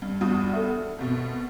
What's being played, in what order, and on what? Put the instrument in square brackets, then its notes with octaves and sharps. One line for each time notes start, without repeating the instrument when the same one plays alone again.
[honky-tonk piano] G2
[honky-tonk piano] E2 G2 D#6 [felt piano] F#4
[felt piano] A4 E5
[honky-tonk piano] G#1 B2